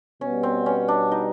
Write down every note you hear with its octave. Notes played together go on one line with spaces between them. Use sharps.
B2 G3 B3 C#4
C4
C#4
D4
D#4